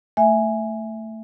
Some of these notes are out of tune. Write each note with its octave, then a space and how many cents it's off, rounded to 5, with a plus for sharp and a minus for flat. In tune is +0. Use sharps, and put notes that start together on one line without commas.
A3 +15 E5 +0 G#5 +0